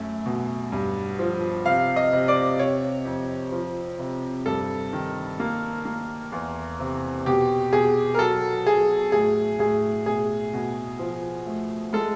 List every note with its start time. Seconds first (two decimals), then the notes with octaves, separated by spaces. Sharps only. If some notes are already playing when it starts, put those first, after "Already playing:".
Already playing: F#2 A3
0.26 B2
0.72 G2
1.19 F3
1.66 C3 F5
1.96 D#5
2.13 C3
2.28 D5
2.59 C3 C#5
3.05 F2
3.52 F3
3.99 C3
4.46 G2 A4
4.93 D#3
5.40 A#3
5.85 A#3
6.32 E2
6.79 C3
7.26 B2 G4
7.73 B2 G#4
8.14 A#4
8.19 F#3 A4
8.66 F#3 G#4
9.12 A2 G#4
9.59 A2 G#4
10.06 B2 G#4
10.53 B2
10.99 F3
11.46 A3
11.93 G#3 A4